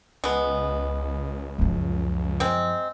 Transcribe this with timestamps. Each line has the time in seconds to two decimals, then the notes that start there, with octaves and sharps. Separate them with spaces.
0.24 C#2 G#3 B3
1.59 F#2 F3
2.40 G#3 C4